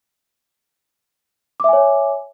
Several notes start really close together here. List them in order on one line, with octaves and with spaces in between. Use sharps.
D6 E5 G#5 C#5